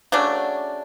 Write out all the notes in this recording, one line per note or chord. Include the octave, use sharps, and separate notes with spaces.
C#3 F#3 A3 D4